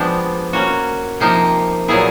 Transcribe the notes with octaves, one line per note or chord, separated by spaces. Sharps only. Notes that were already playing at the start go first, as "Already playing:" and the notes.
Already playing: F3 G#3 B3 D4 G4
A#3 C#4 F#4
C3 F3 A#3 D#4 G4
A#2 F#3 B3 E4 G#4